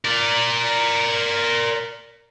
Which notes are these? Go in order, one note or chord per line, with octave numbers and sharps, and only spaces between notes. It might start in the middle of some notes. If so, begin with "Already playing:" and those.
A#4 D5